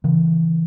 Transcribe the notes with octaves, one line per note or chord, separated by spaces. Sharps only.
C#3 E3